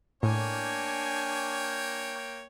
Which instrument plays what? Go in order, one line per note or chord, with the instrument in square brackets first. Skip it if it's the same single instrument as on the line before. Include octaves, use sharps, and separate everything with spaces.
[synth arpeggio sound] A2 [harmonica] A#3 C#5 G5 [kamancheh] D4 G#5